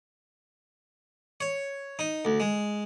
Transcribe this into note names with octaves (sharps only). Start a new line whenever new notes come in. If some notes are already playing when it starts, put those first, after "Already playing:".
C#5
D#4
D2
G#3